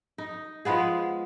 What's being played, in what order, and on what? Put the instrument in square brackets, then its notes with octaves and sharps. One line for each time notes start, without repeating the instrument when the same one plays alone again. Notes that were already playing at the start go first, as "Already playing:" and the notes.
[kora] D#4
F3 G#3 B3 G#4